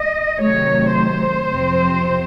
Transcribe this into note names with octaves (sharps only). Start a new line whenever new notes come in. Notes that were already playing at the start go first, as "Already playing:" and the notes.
Already playing: D#5
C3 D#3 F#3 A3 C#5
C5
F2 C3 F3 C4